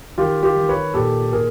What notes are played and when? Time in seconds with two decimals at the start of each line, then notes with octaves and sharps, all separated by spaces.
0.18 D#3 F4 G4
0.43 F4 G4
0.56 D#3
0.69 B4 C#5
0.94 A#2 G4 A4
1.33 A#2 G#4 A#4